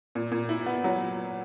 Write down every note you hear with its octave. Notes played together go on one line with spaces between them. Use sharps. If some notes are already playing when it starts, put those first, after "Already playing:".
A#2
A#2
E4
B3
F#3